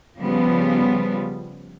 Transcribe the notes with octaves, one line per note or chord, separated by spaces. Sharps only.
C#3 F3 G3 B3